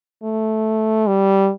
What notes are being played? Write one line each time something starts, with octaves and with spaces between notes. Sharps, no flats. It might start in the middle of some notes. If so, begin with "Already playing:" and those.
A3
G3